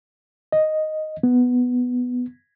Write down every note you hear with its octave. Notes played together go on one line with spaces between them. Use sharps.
D#5
B3